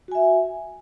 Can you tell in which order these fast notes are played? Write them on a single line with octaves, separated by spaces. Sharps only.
F#4 G#5 E5